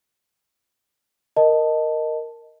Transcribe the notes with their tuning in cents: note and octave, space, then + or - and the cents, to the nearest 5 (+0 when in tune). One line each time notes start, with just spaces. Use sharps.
A#4 +0 D#5 +0 A5 +5